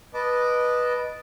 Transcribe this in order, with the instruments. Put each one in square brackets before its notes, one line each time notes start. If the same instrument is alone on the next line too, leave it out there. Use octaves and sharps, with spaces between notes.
[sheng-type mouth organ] B4 D#5 A5 D6